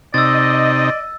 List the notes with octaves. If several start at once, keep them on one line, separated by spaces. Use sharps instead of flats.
C3 D#4 D5 D#5 E6 A6